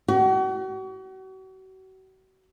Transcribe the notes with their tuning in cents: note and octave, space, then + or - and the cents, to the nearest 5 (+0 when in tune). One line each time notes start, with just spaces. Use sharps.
F#4 +40